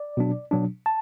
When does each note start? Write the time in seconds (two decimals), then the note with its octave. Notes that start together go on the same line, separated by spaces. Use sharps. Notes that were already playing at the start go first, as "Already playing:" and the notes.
Already playing: D5
0.17 B2 F#3 D4
0.51 B2 F#3 D4
0.86 A5